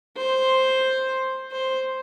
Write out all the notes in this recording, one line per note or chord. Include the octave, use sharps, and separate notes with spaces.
C5
C5